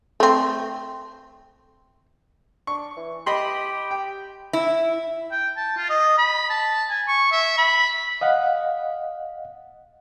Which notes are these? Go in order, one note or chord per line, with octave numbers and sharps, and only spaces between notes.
A3 C4
D4 C#6
E3
G4 D#5 B5 C6
G5
E4
G5
A5
F4
D#5
B5
A5
G#5
C#6
E5
B5
D#5 F5 F#5